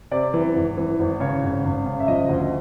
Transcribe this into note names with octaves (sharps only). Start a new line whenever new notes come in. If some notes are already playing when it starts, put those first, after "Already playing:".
C3 D5
E3
G#1
E3
G#1
C#3 C#5
G#1
G#1
C#3
E5
F3 D#5
D2